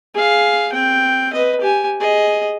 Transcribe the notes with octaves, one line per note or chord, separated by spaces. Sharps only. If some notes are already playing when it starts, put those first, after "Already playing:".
G#4 F5
C4 G5
B4 D#5
G4 G#5
G#4 D#5